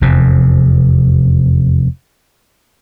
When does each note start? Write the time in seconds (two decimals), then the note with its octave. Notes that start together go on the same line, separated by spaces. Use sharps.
0.01 F1 E2 C3